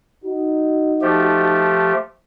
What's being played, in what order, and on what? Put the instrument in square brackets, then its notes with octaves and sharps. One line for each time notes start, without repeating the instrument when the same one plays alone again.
[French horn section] D#4 F#4
[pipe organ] F3 A3 G4